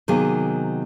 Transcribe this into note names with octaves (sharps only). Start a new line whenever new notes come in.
C3 D#3 F#3 A#3 B3 G#4